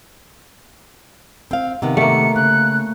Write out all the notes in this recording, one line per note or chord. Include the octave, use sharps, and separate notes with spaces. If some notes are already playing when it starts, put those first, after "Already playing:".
C4 F5
C3 D#3 B3
A3 A#3 C#7
C#3 F#6